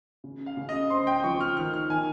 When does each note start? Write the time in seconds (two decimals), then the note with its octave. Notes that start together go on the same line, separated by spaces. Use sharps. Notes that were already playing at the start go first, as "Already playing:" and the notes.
0.24 C#3
0.46 F5
0.57 C#3
0.69 D#5
0.90 C4 C6
1.07 G5
1.24 F3 C#6
1.40 F6
1.57 D#3 F6
1.74 F6
1.89 D#3 G#5